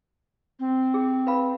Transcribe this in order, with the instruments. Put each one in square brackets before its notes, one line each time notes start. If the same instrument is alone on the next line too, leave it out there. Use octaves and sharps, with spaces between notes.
[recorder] C4
[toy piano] G#4
B4 F5 B5